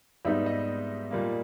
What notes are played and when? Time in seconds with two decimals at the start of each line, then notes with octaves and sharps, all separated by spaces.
0.25 G#2 G3 B3 D#4 E5
0.46 D#5
1.11 A#2 G3 A#3